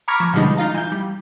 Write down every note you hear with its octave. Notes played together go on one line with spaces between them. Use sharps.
A#5 B5 C#6 D6 F6 G#6
F3
B2 D3 F3 G3 G#3 D#4
D#4 F4 F5 A#5
E3 G6
G3